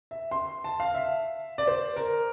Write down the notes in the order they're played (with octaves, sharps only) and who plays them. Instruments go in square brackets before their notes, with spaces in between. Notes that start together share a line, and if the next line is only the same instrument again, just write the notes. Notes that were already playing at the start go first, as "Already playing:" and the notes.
[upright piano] E5
C6
A5
F5
E5
D5
C5
A#4